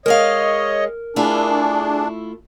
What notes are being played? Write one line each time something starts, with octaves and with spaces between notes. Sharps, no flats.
G#3 G#4 A#4 C#5 D#5 F5
A3 D4 E4 F4 G#4